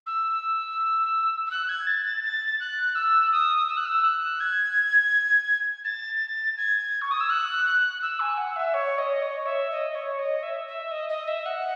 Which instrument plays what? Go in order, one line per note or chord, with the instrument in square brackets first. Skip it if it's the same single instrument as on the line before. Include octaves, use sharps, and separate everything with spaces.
[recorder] E6
E6
F#6
G#6
A6
A6
A6
F#6
E6
D#6
E6
F#6
E6
F#6
G#6
A6
G#6
C#6
D#6
E6
F#6
F#6
E6
G#5
F#5
E5
C#5
D#5
C#5
E5
D#5
C#5
D#5
E5
E5
D#5
D#5
E5
F#5